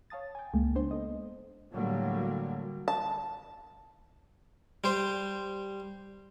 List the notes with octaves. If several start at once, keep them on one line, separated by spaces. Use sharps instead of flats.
C#5 F5 A5 D#6 A6
G5 G#5
C#2 G#3 A#3
B3 D4 C5
A4 D#5
A2 D3 F#3 G3 A#3
A5
G3 C5